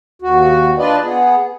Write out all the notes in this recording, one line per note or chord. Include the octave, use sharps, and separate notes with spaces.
D#2 F#4
D4 F4 B4 D5 D#5
B3 G#4